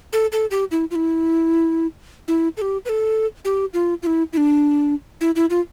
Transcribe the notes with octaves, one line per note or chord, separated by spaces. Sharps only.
A4
A4
G4
E4
F4
E4
E4
A4
G4
B4
A4
G4
F4
F4
E4
E4
D4
E4
E4
F4